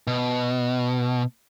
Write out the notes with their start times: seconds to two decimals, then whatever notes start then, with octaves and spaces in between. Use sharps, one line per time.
0.07 B2